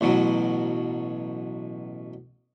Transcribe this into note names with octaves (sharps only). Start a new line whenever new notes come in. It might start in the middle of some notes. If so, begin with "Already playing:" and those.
A1 B2 F#3